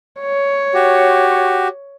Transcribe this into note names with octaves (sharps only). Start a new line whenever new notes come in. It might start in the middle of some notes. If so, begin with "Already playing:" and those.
C#5
F#4 G4